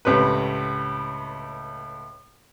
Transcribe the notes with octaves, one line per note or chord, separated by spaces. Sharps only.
C#2 A2 C3 B4